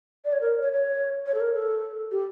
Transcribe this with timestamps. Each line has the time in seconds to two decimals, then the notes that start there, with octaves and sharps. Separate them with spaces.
0.25 D5
0.33 C#5
0.41 A#4
0.62 C#5
0.73 C#5
1.26 C#5
1.34 A4
1.40 A#4
1.54 A4
2.11 G4